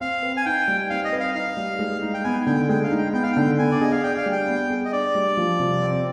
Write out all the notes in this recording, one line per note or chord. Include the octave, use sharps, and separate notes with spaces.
C4 F5
B4
G#5
D#4 G5
G3
C4 F5
D#5
B4
F5
D#4 F5
G3
G#3
D#4
G5
B3 G#5
D3 G5
G#3 G5
F5
D#4
G5
B3 G5
F5
D3 G5
B3 G#5
D5
G#4 D#5
F5
D4 G5
F5
G3
G5
B3
G#4
D#5
D4 D5
G3
F3
C3
C4